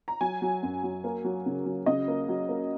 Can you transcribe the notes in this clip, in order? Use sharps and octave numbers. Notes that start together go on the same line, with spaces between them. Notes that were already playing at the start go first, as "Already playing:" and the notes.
A#5
F#3 G#5
F#3
F#2
F#3
A#3
F#3
C#3
F#3
C#3 D#5
A#3
F#3
A#3